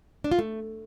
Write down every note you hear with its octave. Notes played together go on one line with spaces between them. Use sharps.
D4
F4
A3